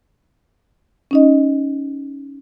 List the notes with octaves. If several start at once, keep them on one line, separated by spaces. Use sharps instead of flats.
C#4 D#4 D#5